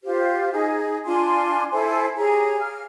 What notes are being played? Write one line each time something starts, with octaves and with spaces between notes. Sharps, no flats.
F4 G4 C5
D#4 G#4
D4 F4 G#5 C6
E4 A4 C5 G#5
G4 G#4 C#5 A#5
F5 F6